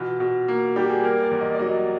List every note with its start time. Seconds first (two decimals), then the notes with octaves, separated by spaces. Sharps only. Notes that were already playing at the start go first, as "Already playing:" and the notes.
Already playing: B2 E3 F4
0.20 B2
0.48 A#3
0.76 G3 G4
0.90 G#4
1.04 A#3 A#4
1.23 D5
1.31 E2
1.41 D#5
1.54 D5
1.59 F#3 D#5